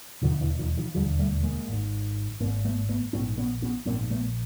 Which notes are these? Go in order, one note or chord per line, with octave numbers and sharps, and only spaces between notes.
E1 D#2 D3 D#3 F3
D3 E3
D#3 F3
D#3 F3
E1 D#2 D3 F3 G3
G3 A3
G#3 A#3
G#1 G#2
G#1 G#2 A#3 C4
A3 B3
A3 B3
A#1 G#2 B3 C#4
B3 C#4
B3 C#4
A#1 G#2 A#3 C4
A3 B3